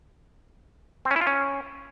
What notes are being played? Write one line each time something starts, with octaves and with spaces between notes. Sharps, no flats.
C4
C#4
E4
F4
C#4